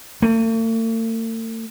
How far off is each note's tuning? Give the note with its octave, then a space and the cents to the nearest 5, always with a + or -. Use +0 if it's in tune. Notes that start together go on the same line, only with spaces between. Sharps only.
A3 +45